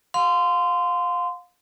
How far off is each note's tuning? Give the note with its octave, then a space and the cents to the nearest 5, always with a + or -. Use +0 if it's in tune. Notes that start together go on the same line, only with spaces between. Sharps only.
F5 +30 C6 -20